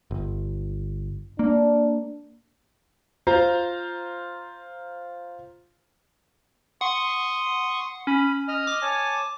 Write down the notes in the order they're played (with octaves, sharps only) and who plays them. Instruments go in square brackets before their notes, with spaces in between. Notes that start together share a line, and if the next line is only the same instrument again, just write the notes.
[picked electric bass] G1
[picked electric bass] A#3 [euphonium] D4
[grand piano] F4 C5 A#5
[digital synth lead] F#5 [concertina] C6 C#6 D#6
[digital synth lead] C#4 [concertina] B5
[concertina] D#5 F6
[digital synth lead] D6
[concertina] C#5 G#5 A5